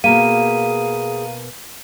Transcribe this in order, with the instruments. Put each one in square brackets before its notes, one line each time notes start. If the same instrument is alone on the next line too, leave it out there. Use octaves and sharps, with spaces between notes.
[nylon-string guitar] B2 A#3 [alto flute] G#4 [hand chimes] F5 A#5 [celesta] D#7